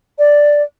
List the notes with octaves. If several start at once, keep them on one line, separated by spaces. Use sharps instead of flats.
D5